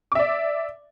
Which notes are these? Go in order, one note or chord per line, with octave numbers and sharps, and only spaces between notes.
D5 E5 D6